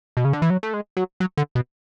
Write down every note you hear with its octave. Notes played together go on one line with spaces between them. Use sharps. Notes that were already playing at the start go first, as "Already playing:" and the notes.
B2
C#3
D3
E3
F#3
A3
G#3
F#3
F#3
D3
B2